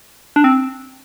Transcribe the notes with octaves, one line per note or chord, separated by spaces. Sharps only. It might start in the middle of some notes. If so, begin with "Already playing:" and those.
D4
C4